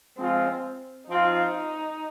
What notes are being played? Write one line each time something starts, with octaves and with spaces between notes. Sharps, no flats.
F3 G#3 C4 F4
F3 C4 D#4 F4